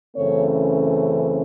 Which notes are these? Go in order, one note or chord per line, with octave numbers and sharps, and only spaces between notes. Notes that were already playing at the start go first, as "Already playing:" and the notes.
F#2 C#3 E3 A3 C4 C#5